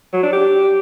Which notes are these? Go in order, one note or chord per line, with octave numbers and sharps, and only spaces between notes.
F#3
D4
G4